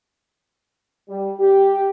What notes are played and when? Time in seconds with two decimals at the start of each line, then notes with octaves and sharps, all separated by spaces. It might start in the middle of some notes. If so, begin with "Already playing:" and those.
1.09 G3
1.39 G4